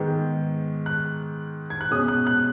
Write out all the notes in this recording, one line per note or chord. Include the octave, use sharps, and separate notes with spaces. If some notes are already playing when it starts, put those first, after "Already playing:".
Already playing: G#2 D#3 G#3 B3
F#6
G#6
F#6
B2 G#3 C#4 D#6
F#6
F#6